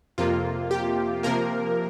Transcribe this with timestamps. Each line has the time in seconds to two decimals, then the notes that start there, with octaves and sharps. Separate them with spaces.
0.18 F2 C3 A#3 F4
0.71 G4
1.23 C3 F3 A#3 A#4